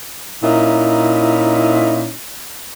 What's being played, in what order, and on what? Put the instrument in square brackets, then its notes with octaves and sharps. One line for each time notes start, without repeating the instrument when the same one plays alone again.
[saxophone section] A#2 C#4 D#4 E4